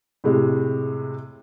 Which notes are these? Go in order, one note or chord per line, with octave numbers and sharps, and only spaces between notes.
A2 C3 G#3